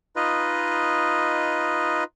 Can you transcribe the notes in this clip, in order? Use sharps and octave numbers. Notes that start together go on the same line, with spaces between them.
D#4 F4 B4 D#5